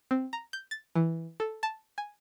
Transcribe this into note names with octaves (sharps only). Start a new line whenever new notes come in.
C4
A#5
G6
A6
E3
A4
A5
G#5